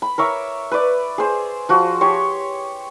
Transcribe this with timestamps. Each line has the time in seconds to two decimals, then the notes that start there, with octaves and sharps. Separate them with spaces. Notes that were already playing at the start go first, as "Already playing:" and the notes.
0.02 B5
0.18 A#4 C#5 E5 D6
0.71 B4 D5
1.18 G#4 C5
1.69 F3 F#4
2.01 G4 C#5 C6